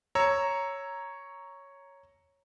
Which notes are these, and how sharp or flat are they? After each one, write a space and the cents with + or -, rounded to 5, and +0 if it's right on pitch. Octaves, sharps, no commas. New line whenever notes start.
C#5 +0 A#5 +0 E6 +0